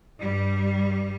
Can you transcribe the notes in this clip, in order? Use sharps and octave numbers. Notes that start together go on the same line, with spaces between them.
G2 G3